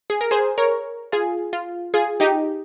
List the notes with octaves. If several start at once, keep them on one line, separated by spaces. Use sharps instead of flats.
G#4
A#4
G#4 C5
A#4 C#5
F4 G#4
F4
F4 G#4
D#4 G4